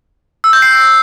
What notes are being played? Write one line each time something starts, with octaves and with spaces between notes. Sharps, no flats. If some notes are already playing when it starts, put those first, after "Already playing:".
E6
G6
C7